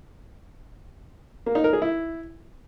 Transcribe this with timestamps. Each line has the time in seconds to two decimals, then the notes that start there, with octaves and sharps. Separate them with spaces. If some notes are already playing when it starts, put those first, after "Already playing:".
1.46 A#3
1.55 D#4
1.64 A#4
1.73 G#4
1.82 E4